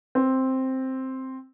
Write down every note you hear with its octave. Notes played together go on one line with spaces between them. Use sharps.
C4